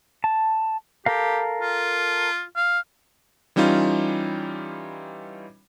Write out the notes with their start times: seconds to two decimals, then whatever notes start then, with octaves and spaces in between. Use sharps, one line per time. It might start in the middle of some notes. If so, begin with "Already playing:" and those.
0.24 A5
1.06 G4 A4 A#4 F5
1.61 F4
2.56 F5
3.56 E3 G3 C#4 D#4 F4